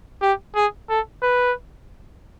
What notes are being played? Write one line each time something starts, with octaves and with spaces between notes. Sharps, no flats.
G4
G#4
A4
B4